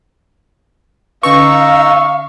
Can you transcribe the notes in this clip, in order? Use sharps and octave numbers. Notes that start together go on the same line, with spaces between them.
D3 C#4 D#4 B4 F5 A#5 C#6 E6